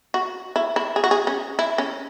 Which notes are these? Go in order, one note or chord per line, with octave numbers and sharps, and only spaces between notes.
F#4
E4
E4
G#4
F#4
G#4
C#4
E4
C#4